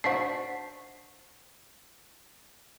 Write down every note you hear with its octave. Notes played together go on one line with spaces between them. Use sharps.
D4 D#4 F#4 C5 B6 C7